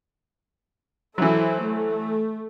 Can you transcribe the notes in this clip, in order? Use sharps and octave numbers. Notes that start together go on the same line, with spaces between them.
E3 F#3 E4 A4 C5
A3